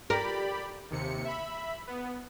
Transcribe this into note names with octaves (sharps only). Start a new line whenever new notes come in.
G4 A#4 D5 B5
D#2 C3 C#7
E5 B5
B3